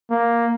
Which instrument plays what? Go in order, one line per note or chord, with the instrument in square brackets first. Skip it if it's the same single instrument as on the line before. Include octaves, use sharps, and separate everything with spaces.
[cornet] A#3